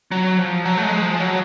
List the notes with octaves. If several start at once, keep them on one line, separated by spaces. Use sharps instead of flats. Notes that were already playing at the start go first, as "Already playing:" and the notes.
F#3
F3
F#3
A3
G#3
F3
F#3